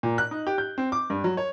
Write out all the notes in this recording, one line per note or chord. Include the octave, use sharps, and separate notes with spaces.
A#2
F#6
D#4
G4
G6
C4
D6
G2
F#3
C#5